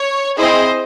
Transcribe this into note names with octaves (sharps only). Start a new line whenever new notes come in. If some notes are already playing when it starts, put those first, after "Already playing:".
Already playing: C#5
C4 E4 G#4 C5 D#5